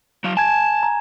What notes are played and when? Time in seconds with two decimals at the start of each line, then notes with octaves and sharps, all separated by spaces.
0.24 F#3 F5
0.37 G#5 A5 G#6
0.83 A#5